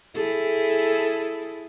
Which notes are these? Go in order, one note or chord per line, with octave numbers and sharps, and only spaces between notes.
E4 G#4 A4